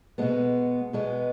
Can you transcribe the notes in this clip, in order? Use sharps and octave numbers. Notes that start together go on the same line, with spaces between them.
B2 G#3 B3
B2 G#3 B3